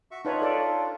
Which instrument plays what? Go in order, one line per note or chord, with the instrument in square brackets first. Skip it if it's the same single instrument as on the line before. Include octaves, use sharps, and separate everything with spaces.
[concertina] F#4 E5 C#6
[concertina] D4 F4 [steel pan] D#4 B4 C#5
[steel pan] A4 D5